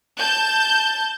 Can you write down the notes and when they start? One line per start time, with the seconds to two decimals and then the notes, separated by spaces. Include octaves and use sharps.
0.18 A5 G6